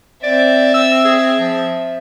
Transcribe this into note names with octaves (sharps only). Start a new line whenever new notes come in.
C4 D5 E5
E6
G#4
F3